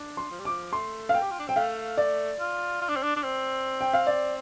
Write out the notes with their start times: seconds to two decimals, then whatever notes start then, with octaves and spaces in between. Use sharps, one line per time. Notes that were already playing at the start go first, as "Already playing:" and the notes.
Already playing: D4
0.17 C6
0.31 F3
0.40 G3
0.45 F3 D6
0.73 A3 C6
1.09 F5
1.14 G5
1.22 G4
1.31 F4
1.39 D4
1.48 C4 G5
1.56 A3 F5
1.98 D5
2.40 F4
2.82 F4
2.89 D4
2.96 C4
3.03 D4
3.16 D4
3.23 C4
3.81 G5
3.94 F5
4.07 D5